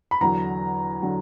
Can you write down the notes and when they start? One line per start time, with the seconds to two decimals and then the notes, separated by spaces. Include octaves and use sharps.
0.11 B5
0.21 E2 D3 F#3 A#5
1.02 D3 F#3